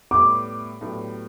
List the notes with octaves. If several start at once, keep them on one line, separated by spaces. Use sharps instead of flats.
A2 G3 B3 D6
A2 F#3 B3 D4 G4